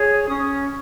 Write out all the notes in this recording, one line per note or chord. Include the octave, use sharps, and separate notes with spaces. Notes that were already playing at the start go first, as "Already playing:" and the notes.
Already playing: G#4 C#5
C#4 D#6